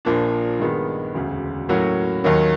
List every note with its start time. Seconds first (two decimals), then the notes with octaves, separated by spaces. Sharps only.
0.05 A#1 A#2 F3 A#3 D4
0.60 G2 D#3 G#3 B3
1.14 E1 D2 C#3
1.69 A2 F#3 A#3 C#4 F#4
2.24 D#2 D#3 F#3 A#3